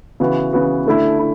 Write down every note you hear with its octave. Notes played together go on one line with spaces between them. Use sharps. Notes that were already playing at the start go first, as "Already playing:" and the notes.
C#3 E3 B3 F#4
C#3 E3 B3 F#4
D3 A3 E4
E4